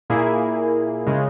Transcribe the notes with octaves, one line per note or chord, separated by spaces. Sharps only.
A#2 A#3 E4 G#4
C#3 G#3